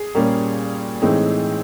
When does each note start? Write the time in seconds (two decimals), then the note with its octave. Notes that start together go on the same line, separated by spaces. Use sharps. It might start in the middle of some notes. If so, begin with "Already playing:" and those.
Already playing: G#4
0.15 A#2 G3 A#3 C#4
1.02 A2 E3 G#3 C4 D#4